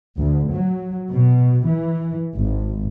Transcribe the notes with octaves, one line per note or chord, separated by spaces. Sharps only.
D2
F#3
B2
E3
G#1